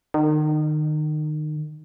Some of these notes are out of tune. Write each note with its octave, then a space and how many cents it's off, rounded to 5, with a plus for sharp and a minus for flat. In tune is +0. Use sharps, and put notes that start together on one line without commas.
D#3 -30